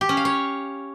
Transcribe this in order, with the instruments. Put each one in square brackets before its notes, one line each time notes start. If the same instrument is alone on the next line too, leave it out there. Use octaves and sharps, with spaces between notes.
[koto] G4
C#4
F5
C#5